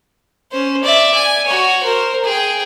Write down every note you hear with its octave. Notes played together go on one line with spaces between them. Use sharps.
C#4 C5
D5 E5
G#5
F#4 C#5
A#4 C5
G#4 G5